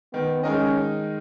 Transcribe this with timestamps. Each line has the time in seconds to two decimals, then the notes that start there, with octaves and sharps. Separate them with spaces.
0.13 D#3 B3
0.43 G#3 C#4 D#4 A#4 D#5